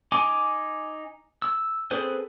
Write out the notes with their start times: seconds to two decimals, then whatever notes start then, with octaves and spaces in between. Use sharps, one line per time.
0.12 D#4 G#5 D6
1.42 E6
1.91 C4 G#4 A4 B4 C5